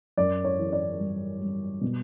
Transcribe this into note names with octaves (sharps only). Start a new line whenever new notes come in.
F#2 D5
C#5
E3
D5
G3
G3
B2